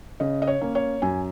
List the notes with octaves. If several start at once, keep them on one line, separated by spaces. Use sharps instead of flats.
C#3 D#5
D#5
C#5
A#3 C#4
C#5
F#2 G#5